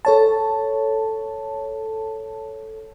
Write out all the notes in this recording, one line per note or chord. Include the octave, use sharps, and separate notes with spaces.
A4 C#5 A5